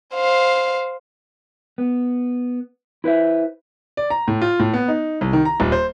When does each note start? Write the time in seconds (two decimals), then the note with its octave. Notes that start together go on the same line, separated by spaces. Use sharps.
0.15 C5 F5
1.78 B3
3.04 E4 B4 C5 E5
3.97 D5
4.10 A#5
4.28 A2
4.42 F4
4.60 A2
4.74 B3
4.88 D#4
5.21 C2
5.33 D#3
5.45 A#5
5.60 D#1
5.72 C5